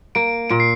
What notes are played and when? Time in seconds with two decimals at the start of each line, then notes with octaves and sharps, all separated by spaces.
0.15 A#3 D7
0.50 A#2 D7
0.60 C7